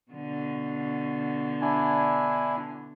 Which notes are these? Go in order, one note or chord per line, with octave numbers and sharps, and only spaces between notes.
B2 D3
D4 E4 G#5